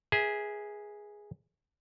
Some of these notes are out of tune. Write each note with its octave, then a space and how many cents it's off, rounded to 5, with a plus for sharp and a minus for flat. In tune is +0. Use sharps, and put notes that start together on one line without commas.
G#4 +0 B4 -45 E5 -25